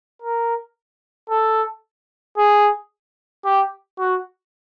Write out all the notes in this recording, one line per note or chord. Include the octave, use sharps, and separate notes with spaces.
A#4
A4
G#4
G4
F#4